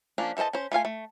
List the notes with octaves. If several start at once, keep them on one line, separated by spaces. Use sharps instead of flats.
F3 A#3 C#4 D4
E3 A4 C5 D#5 A5
C#4 C5
A3 F4 F5 G#5
A3